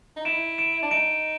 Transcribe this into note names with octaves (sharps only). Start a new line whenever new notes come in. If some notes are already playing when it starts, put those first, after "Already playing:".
D#4
E4 D7 E7
D7 E7
D4
D#4 D7 E7